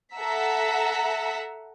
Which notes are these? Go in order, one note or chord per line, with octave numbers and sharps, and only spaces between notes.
A4 E5 F#5 A#5 E6 B6